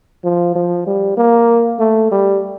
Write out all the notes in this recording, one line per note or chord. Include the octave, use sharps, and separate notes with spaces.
F3
F3
G3
A#3
A3
G3